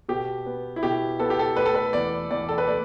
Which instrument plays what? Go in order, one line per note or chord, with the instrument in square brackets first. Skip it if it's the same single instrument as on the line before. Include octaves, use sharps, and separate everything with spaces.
[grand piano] B2 G4
B3
E4
B2 G4
B3 A4
G4
A4
A3 B4
A4
B4
E2 D5
E2 D5
A4
B4
A3 D5